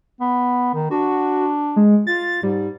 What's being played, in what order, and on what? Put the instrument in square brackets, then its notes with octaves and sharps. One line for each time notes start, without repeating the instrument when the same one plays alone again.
[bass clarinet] B3
D#3
[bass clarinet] D4 [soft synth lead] F#4
[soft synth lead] G#3
[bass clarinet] F4 [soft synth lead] A6
[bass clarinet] G#2 [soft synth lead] G3